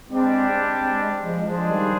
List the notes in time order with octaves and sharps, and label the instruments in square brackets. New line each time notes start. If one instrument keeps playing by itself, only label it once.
[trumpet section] G3 D4 G4 D5 G5 [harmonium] G#3 C4
[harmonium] G#3 C4
F3 G#3
[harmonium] F3 G#3 [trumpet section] D4 G#4 C5
[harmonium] D#3 G3